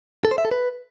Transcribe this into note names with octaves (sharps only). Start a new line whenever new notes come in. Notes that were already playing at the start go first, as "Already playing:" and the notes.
A4
C5
E5
A4
B4